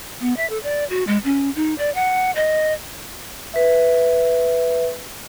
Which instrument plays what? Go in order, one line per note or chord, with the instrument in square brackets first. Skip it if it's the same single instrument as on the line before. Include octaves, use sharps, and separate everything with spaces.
[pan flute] B3
E5
A4
D5
F#4
G#3
C#4
D#4
D5
F#5
D#5
[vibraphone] B4 E5